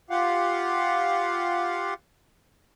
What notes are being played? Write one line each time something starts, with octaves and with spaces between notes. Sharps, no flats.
F4 G4 F5 F#5